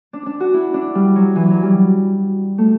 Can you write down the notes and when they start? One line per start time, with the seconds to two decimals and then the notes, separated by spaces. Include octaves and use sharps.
0.13 D4
0.26 D4
0.40 F#4
0.54 E4
0.74 D4
0.95 G3
1.16 F#3
1.36 E3
1.50 F#3
1.63 G3
2.58 A3